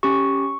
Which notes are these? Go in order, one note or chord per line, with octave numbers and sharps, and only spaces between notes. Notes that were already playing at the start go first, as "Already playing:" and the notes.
C#4 G4 C#6